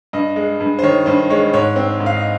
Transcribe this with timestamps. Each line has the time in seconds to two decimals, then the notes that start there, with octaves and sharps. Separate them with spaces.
0.13 G2 D#5
0.36 G#3
0.61 G2
0.79 C5
0.83 D#3 C#5
1.06 G2 C5
1.30 G#3 C#5
1.54 G#2 C#5
1.76 C4
2.00 G#2
2.06 F5
2.15 D#5